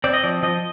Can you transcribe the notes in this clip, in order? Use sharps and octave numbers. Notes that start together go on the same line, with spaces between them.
C4 D5
D#5
F3 D5
F3 D#5